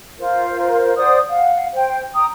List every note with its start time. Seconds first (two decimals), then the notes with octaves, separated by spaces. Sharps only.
0.19 F4 A#4 C5
0.97 C5 D5 F#5 D#6
1.29 F5 F#5
1.74 C5 G5
2.14 G5 A#5 D#6